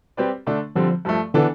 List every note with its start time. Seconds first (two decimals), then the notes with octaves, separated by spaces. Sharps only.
0.17 G3 C4 G4 B4 D5
0.47 D3 A3 D4
0.76 D3 F3 G3 C4
1.05 G2 F3 A3
1.34 D3 E3 B3 D4 A4